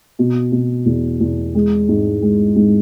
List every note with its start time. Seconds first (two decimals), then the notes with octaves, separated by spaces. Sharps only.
0.19 B2
0.52 B2
0.86 E2
1.20 E2
1.55 G#3
1.89 G#2
2.22 G#3
2.56 G#2